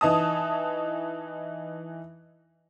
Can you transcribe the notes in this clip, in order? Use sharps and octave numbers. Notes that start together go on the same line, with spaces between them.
E3 D#4 A5 D#6